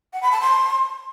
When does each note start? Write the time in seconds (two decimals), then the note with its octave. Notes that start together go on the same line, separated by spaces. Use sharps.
0.13 F#5
0.23 B5
0.32 A5
0.41 C6